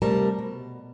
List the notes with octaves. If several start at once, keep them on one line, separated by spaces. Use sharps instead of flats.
C3 G3 A3 A#4 A5
B2